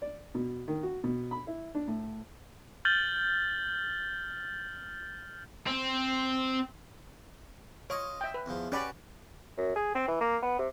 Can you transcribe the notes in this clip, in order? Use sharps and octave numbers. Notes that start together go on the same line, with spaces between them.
D5
B2
D#3
F#4
B2
B5
E4
D4
A2
F6 G6 A6 F#7 G7
C4
F4 C#5 D#5
E5 G5
B4
E2 F3
C#4 F#4 G4 B4 D5 B5
F#2
G#4
C4
E3
A#3
B3
C3